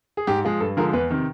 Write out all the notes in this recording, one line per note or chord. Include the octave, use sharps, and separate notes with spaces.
G#4
G#2 G4
F3 G#3
G2 A4
D3 F3 G#3 A#4
E2 B4
C3 D#3